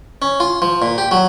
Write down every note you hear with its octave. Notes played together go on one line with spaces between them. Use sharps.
C#4
F4
F3
A#2
G4
F#3